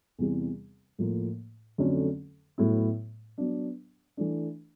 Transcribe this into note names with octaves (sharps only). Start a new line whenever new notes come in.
E2 C3 E3 G3
A2 F3 A#3
F2 D3 F#3 A3 C#4
A2 F#3 B3 E4
F#3 B3 D4
E3 A3 D4